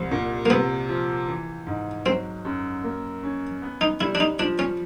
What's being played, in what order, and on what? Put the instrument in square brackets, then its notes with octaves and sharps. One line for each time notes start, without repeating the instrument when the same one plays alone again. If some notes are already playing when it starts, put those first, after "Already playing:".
Already playing: [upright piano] C2 [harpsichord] F3
[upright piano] A#2
[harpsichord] A#3
[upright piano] C3 [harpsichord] B3
[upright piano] F3
E3
G#2
[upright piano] F#3 [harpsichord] C4
[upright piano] F#2
A#3
C#4
B3
[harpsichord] D#4
[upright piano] G3 [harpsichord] E4
[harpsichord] D4
D#4
[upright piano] F3 [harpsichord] D4
[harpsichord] C#4